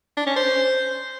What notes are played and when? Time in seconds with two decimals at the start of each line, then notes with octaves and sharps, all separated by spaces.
0.17 D4
0.27 C#4
0.36 C5